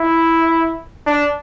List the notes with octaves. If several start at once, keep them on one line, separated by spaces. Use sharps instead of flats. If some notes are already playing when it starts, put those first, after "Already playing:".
Already playing: E4
D4